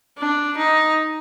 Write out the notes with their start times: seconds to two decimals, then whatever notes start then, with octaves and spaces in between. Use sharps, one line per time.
0.18 D4
0.57 D#4